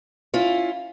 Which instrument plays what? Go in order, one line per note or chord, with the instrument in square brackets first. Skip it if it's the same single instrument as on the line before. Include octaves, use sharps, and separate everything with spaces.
[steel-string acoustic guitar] C#4 E4 F4